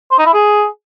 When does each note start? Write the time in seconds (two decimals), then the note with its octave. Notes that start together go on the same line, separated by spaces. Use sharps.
0.11 C5
0.19 D#4
0.26 E4
0.34 G#4